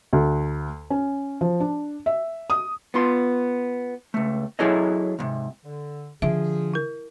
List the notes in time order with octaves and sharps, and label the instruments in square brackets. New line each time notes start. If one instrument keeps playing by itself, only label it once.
[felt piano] D2
C#4
F3
D4
E5
D#6
[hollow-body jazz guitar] B3 F4 C6
C#2 A3
F#3 E4 G#4 A4 C#5 D#5
C#2 G#2 C3
[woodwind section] D3
[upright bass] D3 [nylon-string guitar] F3 [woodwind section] G#4 [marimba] E5
[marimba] E4 A#4